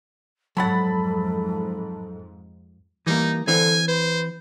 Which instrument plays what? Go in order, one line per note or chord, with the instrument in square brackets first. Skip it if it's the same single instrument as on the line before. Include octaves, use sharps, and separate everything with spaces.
[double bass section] F2 G#2 [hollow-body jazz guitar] F#3 F#5 [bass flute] A4 [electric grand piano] A5 B5 A6
[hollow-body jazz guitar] E3 G3 A#3 [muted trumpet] D#4
[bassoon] D3 [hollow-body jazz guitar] E3 C4 [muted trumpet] G#5
[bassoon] B4 [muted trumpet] C5